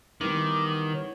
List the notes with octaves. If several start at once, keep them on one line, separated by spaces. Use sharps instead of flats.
D#3 E3 G3 B3 D6
C#5